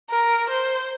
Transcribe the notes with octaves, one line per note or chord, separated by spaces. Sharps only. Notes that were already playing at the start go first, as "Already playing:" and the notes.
A#4
C5